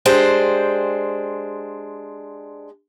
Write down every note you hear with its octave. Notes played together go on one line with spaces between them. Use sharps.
G#3 D4 G4 C5 G5